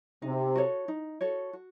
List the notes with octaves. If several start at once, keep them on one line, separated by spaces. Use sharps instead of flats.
C3 D#4
F#4 A4 C#5
D#4
F#4 A4 C#5
F#4